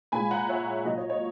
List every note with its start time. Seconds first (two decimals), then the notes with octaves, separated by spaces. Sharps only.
0.12 A#2 G#3 G#5 B5
0.31 F#5 A#5
0.49 C#5 E5
0.85 A#2 F#3 D#5
0.98 C#5
1.10 C#5